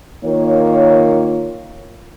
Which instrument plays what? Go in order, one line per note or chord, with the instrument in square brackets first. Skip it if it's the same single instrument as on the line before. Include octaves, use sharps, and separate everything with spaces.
[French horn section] D#3 A#3 F4 C#5